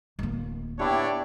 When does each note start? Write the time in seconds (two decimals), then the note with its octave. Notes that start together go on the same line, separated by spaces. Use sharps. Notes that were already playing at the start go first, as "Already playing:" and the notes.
0.19 D1 A#3
0.79 B3 D4 E4 G4 C#5 D5